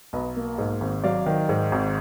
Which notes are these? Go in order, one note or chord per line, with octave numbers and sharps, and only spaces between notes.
B1 B4 D#5
A#3
G#2
G#1
F#3 D5 F5
D#3
G#2
G#1